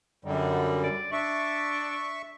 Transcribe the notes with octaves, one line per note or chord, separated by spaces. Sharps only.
F#2 D3 G3 D#4
D5
D4 E5 C#6